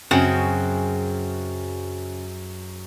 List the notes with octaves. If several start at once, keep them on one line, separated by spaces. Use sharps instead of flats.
F#2 C#3 C4 F#4 G#4